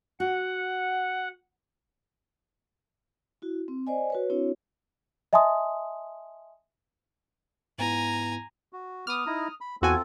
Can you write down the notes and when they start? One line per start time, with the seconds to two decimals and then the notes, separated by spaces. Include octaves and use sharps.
0.20 F#4 F#5
3.42 E4 F#4
3.68 C4
3.87 C5 D5 D#5 G#5
4.10 F#4 B4 C#5
4.30 C4 D4 E4 F#4 C#5
5.33 D#5 E5 G#5 A5 C6 D#6
7.78 G#2 B3 E4 G#5 A#5
8.73 F#4
9.07 B3 D6 D#6 F6
9.27 D#4 E4 A#5
9.61 B5
9.82 E2 C4 F4 F#4 A4 G#5